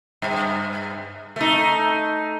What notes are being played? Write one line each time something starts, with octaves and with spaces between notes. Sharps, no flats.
G2
A3 D#4